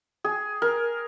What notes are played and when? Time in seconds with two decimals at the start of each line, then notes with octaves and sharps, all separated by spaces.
0.24 G#4
0.62 A#4